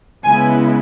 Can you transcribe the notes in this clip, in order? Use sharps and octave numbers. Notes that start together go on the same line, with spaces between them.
C#3 G#3 B3 E4 G#5